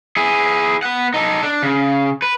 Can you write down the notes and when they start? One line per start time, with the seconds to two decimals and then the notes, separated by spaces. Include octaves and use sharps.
0.17 E4 G#4
0.83 B3 F#5
1.14 D#4 A4
1.43 D4
1.63 C#3
2.22 B4